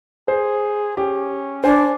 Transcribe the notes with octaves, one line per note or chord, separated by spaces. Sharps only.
G#4 C5
C#4 G4
D4 C5 G#5